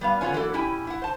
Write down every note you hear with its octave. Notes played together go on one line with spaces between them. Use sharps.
G3 B3 F5
D3 B3 C#4 F4 C#5 G#5
E3 F#3 A#3 A4
B2 C#4 E4 G4 G5 G#5
E4 F#5
C5 A5